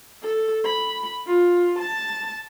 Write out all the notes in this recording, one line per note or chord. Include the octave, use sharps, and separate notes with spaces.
A4
B5
F4
A5